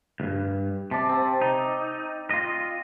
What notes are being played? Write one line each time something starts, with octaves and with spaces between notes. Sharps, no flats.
D2 G2
C3 D5 A5
C4
D#4
F4 D#5